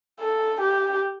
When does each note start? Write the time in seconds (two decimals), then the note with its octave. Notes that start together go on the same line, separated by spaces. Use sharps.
0.20 A4
0.61 G4